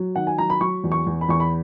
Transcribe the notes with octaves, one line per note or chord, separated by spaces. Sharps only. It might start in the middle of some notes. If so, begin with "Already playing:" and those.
Already playing: F#3
D#3 F#5
G#5
F#3 A#5
B5
F#3 C#6
E2
C#6
E2
B5
E2 C#6
B5